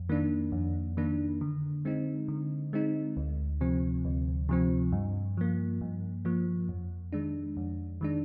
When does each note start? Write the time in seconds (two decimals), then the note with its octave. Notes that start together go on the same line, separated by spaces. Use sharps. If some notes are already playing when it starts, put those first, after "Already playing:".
Already playing: F2
0.09 D#3 A#3 D4
0.52 F2
0.97 D#3 A#3 D4
1.41 D3
1.85 G#3 C4 D#4
2.28 D3
2.73 G#3 C4 D#4
3.17 D2
3.61 C3 F3 C4
4.05 D2
4.49 C3 F3 C4
4.92 G2
5.37 F3 A#3
5.81 G2
6.25 F3 A#3
6.69 F2
7.13 D#3 G#3 D4
7.57 F2
8.01 D#3 G#3 D4